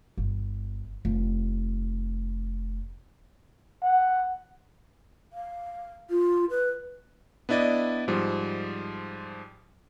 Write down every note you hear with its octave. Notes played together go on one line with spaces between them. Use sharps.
G1
F1
F#5
F5
F4
B4
B3 D4 E4 D5 D#5
G#2 F3 G3